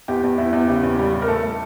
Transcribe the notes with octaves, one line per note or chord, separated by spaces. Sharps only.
E2 G4
E2
E2 E4
E2
C#3 G4
E2
G3
G3
A#4
A3 A4
A3